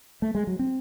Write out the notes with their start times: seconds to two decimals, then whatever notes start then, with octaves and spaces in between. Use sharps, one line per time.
0.22 A3
0.35 G#3
0.47 F#3
0.59 C4